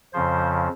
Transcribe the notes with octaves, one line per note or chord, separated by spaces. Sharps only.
F2 C#3 F3 C5